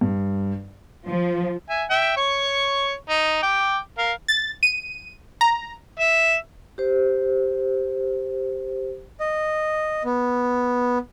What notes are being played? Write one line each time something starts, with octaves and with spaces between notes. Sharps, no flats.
G2
F3
E5 G#5
E5 G5
C#5 C#6
D#4
G5 D6
A#4 F5
A6
D#7
A#5
E5
G4 C5
D#5
B3